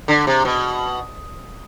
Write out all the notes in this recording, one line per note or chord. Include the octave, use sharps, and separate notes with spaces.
D3
C3
B2